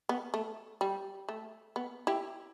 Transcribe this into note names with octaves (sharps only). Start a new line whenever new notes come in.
B3
A3
G3
A3
B3
E4 G4